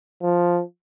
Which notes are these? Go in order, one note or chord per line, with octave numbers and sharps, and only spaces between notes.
F3